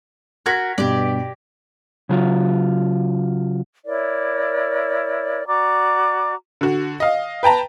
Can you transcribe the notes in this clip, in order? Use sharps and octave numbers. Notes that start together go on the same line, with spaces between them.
F#4 A#4 G#6 A#6 B6
G2 B2 G4 D5
C#3 F#3 F4
E4 A#4 C#5 D5
F#4 D5 A#5 D6
D3 F#4
D#5 F5
B4 G5 A5 A#5